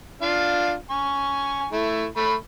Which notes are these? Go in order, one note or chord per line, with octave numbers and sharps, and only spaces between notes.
D4 F4 F5
G#5 C#6
A3 E4
A3 B5